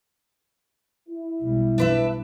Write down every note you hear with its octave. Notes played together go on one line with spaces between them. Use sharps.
E4
B1 G3
D4 B4 E5